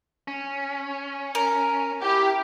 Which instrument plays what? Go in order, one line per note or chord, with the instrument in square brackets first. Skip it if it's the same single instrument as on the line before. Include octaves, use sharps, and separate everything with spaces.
[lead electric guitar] C#4
[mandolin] A#4
[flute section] E4 D6 [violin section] G4